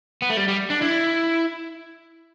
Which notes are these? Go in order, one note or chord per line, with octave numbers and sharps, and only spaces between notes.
B3
A3
G3
G3
D4
E4